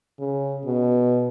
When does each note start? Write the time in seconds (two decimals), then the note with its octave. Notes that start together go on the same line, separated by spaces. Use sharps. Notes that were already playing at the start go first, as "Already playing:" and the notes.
0.19 C#3
0.65 B2